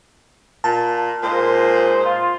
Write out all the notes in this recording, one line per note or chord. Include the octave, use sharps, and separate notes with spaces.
A#2 A5
A#2 G#3 D#4 C5
F4